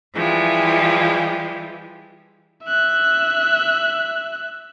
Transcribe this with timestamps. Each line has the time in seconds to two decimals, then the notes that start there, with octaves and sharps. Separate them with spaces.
0.14 E3 F3 G3 G#3
2.64 E5 F#6